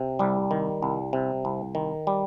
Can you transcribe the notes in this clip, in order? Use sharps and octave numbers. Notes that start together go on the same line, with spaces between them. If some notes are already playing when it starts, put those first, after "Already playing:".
Already playing: C3
C2 G3
D#3
C2
C3
C2
D#3
G3